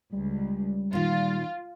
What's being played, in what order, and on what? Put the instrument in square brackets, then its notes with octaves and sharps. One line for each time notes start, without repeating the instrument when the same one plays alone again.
[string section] C#2 [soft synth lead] G3
[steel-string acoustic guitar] A#2 D#3 [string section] F4